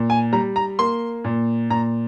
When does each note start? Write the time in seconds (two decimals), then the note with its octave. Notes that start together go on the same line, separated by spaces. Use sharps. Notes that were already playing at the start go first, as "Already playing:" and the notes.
Already playing: A#2
0.10 G#5
0.33 G3 A#5
0.56 A#5
0.79 A#3 C6
1.24 A#2
1.70 A#2 A#5